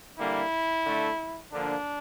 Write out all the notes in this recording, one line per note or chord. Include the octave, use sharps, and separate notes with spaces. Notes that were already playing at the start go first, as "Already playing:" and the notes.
D3 G3 A#3 E4
D3 A3
D3 F3 A#3 D4